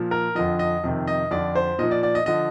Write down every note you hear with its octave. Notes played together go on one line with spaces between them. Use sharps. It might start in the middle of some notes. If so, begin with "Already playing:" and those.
Already playing: A#2 F3
A#4
F2 D3 F3 D#5
D#5
F2 C3 D#3
D#5
F2 D3 F3 D5
C5
A#2 F3 D#5
D5
D5
D#5
D3 F3 D#5